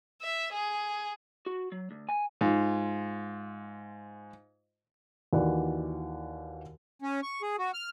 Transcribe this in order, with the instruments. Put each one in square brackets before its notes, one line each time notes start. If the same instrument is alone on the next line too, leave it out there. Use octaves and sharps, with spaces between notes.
[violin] E5
G#4
[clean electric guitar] F#4
F#3
D2
G#5
[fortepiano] G#2 F4
[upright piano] D#2 D#3 E3 F#4 D5 F#5
[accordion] C#4
C#6
G#4
F#4
F6